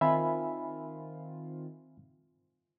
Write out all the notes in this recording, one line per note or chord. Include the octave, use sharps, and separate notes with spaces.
D#3 C4 F4 E5 G#5 B5